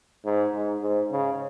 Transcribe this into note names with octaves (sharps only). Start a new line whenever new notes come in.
G#2
G#2
G#2
C#3